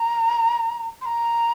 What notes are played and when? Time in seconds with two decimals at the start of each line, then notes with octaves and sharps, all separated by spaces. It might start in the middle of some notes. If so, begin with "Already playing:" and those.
Already playing: A#5
1.01 C6
1.06 A#5